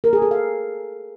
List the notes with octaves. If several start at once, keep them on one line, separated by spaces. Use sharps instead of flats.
A#4
G#4
A4
F5